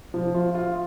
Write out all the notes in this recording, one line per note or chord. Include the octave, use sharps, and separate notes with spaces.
F3
F4
F4